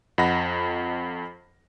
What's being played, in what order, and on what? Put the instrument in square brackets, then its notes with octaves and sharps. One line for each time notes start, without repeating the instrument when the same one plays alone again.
[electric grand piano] F2 D#5 F#5 A#5 B5 A#6